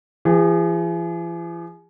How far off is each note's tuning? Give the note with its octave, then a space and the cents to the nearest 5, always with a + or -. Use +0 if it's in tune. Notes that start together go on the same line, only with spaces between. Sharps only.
E3 +45 G#4 -35